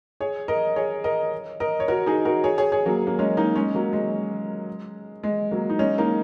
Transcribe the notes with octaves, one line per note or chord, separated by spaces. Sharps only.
G#4 C#5
A#4 D#5
G#4 C#5
A#4 D#5
A#4 D#5
C#5
F#4 A#4
D#4 G#4
F#4 A#4
G#4 C#5
G#4 C#5
G#4 C#5
F#3 A#3
A#3
G#3 C#4
A#3 D#4
G#3 C#4
F#3 A#3
G#3
G#3
F#3 A#3
D#4
G#3 C#4
A#3 D#4